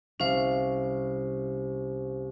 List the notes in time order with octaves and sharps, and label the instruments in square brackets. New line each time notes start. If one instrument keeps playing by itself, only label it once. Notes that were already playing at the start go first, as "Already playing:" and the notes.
[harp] C2 F5 [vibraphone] C#4 C5